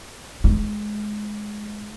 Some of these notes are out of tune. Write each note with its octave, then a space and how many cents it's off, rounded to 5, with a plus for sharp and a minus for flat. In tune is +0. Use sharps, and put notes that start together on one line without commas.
G#3 +15